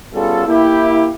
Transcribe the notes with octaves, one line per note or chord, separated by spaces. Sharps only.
G3 B3 C#4 F4 G#4 A4
A#3 E4 G4